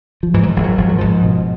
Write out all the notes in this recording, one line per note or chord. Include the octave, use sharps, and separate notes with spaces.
F3
G#2 E3
F#3
F3
G#1
F#3
G#1 F3
F#3
G#2 F3
B2